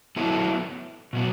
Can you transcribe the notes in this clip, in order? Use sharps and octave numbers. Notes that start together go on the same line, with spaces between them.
F#3 B3 E4 A4
B2 F#3 B3